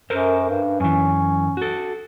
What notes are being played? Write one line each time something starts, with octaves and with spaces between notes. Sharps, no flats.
F#2 A4 A#4 C5
G2
F#2 E3 C#4
F#4 A4